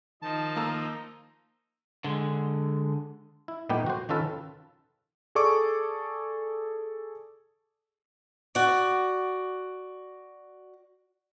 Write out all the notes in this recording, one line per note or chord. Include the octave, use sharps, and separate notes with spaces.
D#3 F3 D#4 A5
A#3 A#5 E6
D3 G#3
E4
A#2 G3 A3 B3 D#4 G4
F#4 C5
D#3 C#4 F4 A4 B4
G#4 A4 D5 C#6 D6
F#4 D5